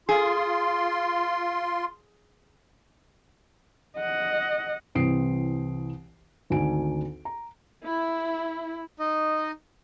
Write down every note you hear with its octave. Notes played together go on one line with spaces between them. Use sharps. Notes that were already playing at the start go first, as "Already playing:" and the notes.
F4 G#4 C6
D#5 F#5
C2 E3 C4 D#6 C7 D7
G#1 D2 D4 D#4 G#5 D7
A#5
E4
D#4 D#5